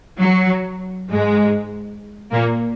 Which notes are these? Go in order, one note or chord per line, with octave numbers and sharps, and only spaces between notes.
F#3
G#2 G#3
A#2 A#3